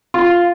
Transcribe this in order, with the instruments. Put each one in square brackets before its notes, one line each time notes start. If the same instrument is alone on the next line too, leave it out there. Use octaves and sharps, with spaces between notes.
[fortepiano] F4